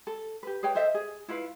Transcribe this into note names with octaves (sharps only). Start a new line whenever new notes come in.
A4
G4 B4
G#4 B4 C#5 G5
A4 C5 D#5 E5
G#4
E4 F4 B4 F5